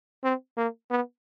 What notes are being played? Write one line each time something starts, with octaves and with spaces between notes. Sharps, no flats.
C4
A#3
B3